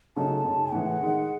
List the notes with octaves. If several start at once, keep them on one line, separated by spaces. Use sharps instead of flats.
C#3 F#3 A3 D#4 A5
F#2 C#3 G#3 D#4
A2 E3 G#3 F#5
D#3 G#3 D#4